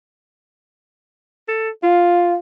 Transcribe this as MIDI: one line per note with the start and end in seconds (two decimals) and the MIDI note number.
1.48 1.70 69
1.83 2.37 65
1.83 2.35 77